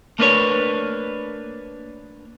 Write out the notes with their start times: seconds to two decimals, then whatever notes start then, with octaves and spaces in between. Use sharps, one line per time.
0.19 A3 A#3 D4 B4 C#5